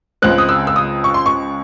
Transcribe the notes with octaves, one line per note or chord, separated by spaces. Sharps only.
C#2 C#3 G#3 C4 F#6
D#6
E6
E6
D#6
C#6
C6
C#6